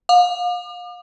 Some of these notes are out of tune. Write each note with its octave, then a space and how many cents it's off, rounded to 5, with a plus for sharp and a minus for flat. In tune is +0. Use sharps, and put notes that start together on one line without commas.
F5 +35 D6 +45